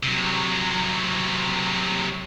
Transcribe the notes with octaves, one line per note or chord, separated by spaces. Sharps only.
C3 F#3